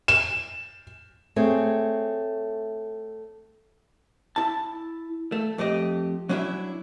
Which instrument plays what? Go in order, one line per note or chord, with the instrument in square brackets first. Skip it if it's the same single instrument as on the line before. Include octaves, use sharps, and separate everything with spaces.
[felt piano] E7
[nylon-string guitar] A3 C4 G#4 C#5
[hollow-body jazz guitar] E4 A5
A3
F2 A3 G4 D#5
F#3 C#4 D4 E4 E5